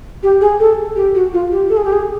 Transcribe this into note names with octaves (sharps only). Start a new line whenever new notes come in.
G4
G#4
A4
G4
F#4
F4
G4
A4
G#4
G4
G#4